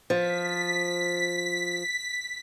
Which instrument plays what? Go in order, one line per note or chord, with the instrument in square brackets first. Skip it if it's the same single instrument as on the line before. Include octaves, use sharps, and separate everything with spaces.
[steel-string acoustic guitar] F3 [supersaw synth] B6